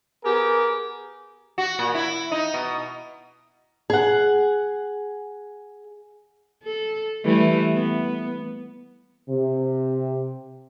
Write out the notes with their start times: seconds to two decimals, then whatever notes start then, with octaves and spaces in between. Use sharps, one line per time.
0.24 B3 G4 G#4 A#4
1.58 F#4
1.79 A#2
1.95 E4
2.32 D#4
2.54 B2
3.90 G#4 F#5
6.64 A4
7.24 E3 G3 A3
7.74 B3
9.30 C3